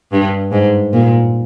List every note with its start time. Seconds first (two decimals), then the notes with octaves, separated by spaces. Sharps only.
0.12 G2
0.52 G#2
0.93 A#2